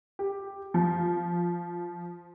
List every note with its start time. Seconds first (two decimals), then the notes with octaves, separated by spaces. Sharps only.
0.19 G4
0.74 F3